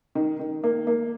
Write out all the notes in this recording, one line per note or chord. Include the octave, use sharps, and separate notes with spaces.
D#3
D#3
A#3
A#3